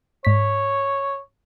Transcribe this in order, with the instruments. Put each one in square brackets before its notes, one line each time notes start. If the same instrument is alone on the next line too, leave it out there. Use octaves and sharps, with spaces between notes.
[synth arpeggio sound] G#2 B6 [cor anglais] C#5